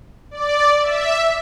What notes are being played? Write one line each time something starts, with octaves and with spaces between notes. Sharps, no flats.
D5
E5